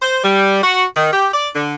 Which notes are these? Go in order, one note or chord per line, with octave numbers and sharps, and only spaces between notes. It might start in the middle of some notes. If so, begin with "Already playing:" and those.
C5
G3
F#4
D#3
G4
D5
D3